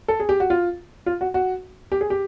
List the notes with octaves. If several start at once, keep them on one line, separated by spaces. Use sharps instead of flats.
A4
G#4
G4
F#4
F4
F4
F#4
F#4
G4
G#4
G4